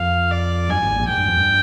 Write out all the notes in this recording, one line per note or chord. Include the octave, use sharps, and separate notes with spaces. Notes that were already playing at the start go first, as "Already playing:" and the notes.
Already playing: F2 F5
D5
G2 G#5
G#1 G#2
A#1 A#2
G#2 G5
G2
F2
G2